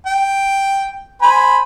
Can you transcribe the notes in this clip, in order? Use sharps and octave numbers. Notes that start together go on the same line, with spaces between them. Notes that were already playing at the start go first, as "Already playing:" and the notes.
G5
C5 G#5 B5